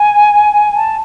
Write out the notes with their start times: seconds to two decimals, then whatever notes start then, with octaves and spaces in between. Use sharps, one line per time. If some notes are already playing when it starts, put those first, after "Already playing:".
Already playing: G#5
0.75 A5